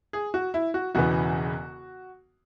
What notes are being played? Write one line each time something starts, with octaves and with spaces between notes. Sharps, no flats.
G#4
F#4
E4
F#4
E1 E2 C#3 E3 B3 F#4